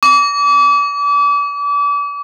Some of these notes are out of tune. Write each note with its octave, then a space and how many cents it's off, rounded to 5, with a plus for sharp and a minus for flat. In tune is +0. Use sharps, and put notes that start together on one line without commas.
D6 -35